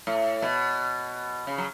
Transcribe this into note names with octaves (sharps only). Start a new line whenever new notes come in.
A2
B2
C#3
F#3